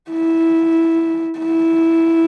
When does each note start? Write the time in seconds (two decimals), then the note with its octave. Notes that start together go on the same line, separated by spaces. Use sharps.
0.11 E4
1.39 E4